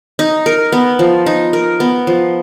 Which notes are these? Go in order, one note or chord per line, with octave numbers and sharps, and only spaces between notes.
D#4
A#4
B3
F3
D#4
A#4
B3
F3